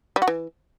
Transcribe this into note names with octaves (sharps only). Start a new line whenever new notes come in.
G3
F#4
E3